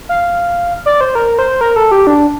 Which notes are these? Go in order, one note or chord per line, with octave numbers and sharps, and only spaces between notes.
F5
D5
C5
A#4
C5
A#4
A4
G4
D4